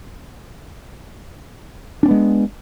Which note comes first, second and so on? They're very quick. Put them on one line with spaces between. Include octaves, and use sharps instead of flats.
D4 C#4 B3 G#3